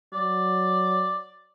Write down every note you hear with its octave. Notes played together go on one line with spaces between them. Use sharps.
F#3 D5